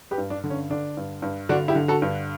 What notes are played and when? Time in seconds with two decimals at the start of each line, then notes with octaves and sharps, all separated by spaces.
0.11 G4 B4
0.18 G2
0.30 D4
0.44 D3
0.50 C#4
0.70 D3 D4
0.97 G2
1.22 G2
1.49 D3 D4 F#4
1.68 E4 G4
1.75 D3
1.88 F#4 A4
2.02 G2